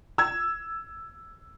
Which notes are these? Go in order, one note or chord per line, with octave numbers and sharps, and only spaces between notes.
E6 G#6